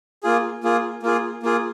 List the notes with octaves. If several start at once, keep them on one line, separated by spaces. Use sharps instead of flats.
A#3 F4 G#4
A#3 F4 G#4
A#3 F4 G#4
A#3 F4 G#4